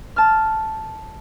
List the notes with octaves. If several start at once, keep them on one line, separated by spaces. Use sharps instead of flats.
A5 F6